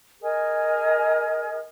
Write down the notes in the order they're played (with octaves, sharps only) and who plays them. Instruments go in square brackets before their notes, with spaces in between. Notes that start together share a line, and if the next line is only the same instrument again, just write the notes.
[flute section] G#4 A#4 D#5 G#5